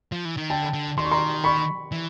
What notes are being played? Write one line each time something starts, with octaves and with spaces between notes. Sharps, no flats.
F3
E3
D#3
D3 G5 A5
D3
D#3 C6
C#6
A#5 C6
B5 C#6
E3